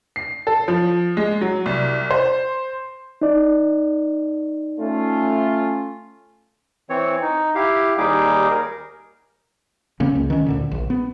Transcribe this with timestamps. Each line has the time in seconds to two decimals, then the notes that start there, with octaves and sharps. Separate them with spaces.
0.16 C7
0.47 A4
0.68 F3
1.17 G#3
1.41 F#3
1.66 C2
2.11 C5
3.21 D#4 D5
4.78 A3 C#4 F4
6.90 E3 C4 C#5
7.22 D#4
7.55 E4 G4 F5
7.98 D#2 G3 D#4 G#4 D6
8.50 A#4
10.00 C#3 A#3 C4 C#4
10.15 C#2
10.30 D#3 C#4
10.46 D2 A#2 D3
10.71 A#1
10.90 B3